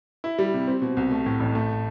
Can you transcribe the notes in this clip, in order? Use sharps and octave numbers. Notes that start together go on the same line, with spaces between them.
E4
G3
C3
C4
B2
C2
A3
A2
A1
A3